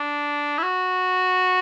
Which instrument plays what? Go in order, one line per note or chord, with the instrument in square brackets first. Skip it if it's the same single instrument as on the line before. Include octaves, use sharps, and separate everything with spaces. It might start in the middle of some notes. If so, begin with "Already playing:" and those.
Already playing: [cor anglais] D4
E4
F#4